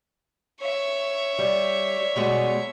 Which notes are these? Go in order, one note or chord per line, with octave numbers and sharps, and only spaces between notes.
C#5 E5
G3
B2 G3 G#3